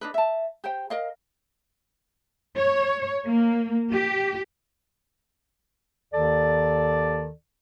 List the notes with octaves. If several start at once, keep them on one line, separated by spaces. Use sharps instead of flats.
D4 D#4 B4
E5 A5
G4 C5 G5
A#4 D#5 F5
C#5
A#3
G4
D#2 D#3 A4 D5